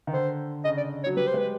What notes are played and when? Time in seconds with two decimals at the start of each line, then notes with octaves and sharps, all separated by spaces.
0.07 D#3
0.13 D3 C5
0.65 C#3 D#5
0.77 D5
1.04 C#5
1.06 F#3
1.17 G3 B4
1.27 C5
1.34 G#3 B4